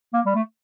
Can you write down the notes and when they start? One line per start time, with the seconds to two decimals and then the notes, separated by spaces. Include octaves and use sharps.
0.13 A#3
0.26 G3
0.35 A3